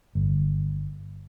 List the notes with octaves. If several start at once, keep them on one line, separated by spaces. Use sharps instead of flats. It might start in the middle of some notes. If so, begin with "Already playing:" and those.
G1